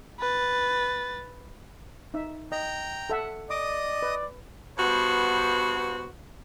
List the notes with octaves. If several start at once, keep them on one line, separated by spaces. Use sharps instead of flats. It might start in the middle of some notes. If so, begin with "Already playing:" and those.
B4 A6
D#4 E5
D#5 G5 A#5
A4 E5 F#5
D5 D#5 D6 D#6
B4
G2 B3 F#4 C5